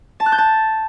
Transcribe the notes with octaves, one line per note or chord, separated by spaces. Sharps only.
A5
F#6
G6
A5